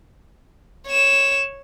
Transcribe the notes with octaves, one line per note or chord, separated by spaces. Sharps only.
C#5 E7